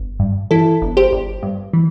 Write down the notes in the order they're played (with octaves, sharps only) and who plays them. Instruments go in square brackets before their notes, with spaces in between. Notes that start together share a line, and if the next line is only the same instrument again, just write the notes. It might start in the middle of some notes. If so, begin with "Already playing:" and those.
Already playing: [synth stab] G1
G2
E3 E4 A4
G1
G4 C5
G1
G2
E3